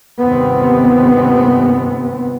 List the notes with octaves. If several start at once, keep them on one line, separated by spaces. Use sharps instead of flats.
G1 D#2 C3 B3 C4